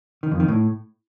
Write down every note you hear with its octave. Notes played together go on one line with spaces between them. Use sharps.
D#3
F2
D#3
A2